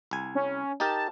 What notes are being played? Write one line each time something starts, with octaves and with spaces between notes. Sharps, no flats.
C2 G#5
C#4
D#4 G4 A#4 A5